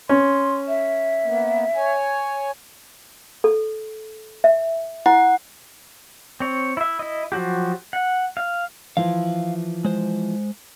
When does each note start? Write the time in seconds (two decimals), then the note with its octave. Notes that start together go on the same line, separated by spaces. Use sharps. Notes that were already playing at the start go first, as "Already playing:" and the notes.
0.09 C#4 C6
0.68 E5
1.24 A#3 B3
1.76 C#5 G#5
3.44 A4
4.44 E5
5.06 E4 F#5
6.40 C4 C#5
6.77 E4 E5
6.99 E4 D#5
7.32 F3 F#3 F#4 G4
7.93 F#5
8.37 F5
8.97 E3 F3 E4 F5
9.85 G#3 C5